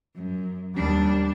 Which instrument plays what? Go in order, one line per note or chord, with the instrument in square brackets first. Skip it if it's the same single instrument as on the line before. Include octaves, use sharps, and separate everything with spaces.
[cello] F#2
[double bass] D#2 G3 [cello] D4